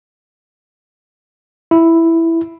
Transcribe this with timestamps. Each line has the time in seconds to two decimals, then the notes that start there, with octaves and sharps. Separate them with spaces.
1.71 E4